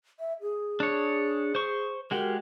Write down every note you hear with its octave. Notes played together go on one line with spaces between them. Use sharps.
E5
G#4
D4 C#5
C5 C#6
G#3 F#4 G4 A#4